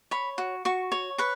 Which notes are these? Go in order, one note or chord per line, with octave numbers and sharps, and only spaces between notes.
C#5 B5
F#4
F#4 C#6
C#5
B4 C#6